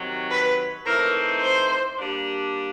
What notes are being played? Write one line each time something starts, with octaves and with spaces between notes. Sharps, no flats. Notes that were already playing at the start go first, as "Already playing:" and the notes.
Already playing: C3 D#3 F#3
B4
E3 A3 C4 D#4 A#4
C5
G3 A#3 D4